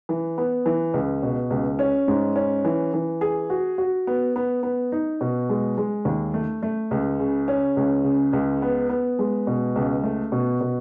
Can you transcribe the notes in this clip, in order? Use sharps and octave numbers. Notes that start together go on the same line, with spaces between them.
E3
B3
E3
C#2
B2
C#2
C#4
G#2
C#4
E3
E3
G#4
F#4
F#4
B3
B3
B3
D#4
B2
G#3
G#3
D#2
A3
A3
C#2
C#3
C#4
C#2
C#3
C#2
B3
B3
G#3
B2
C#2
A3
B2
B2